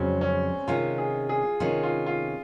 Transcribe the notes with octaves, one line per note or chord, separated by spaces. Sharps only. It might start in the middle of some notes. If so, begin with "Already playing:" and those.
Already playing: F2 C#3 F#3 G#3 C4 C#4
C#4
C3 D#3 G#3 C#4 F4
G#4
G#4
C3 D#3 G#3 C#4 F4
F4
F4